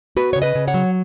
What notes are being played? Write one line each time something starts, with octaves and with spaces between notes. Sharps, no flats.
B3 F#4 B4
C#3 C#5
B4 D#5
C#3
C#5 F#5
F#3